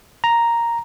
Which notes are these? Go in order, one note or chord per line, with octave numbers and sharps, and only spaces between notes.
A#5